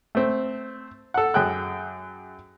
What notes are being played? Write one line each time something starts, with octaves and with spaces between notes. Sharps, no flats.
A3 C4
A4 F#5
F#2 G#4 G5 F#6